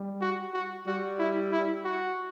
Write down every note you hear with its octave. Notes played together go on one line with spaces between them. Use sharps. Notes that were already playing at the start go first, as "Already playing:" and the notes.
Already playing: G3
F#4
F#4
G3 F#4
E4
E4
F#4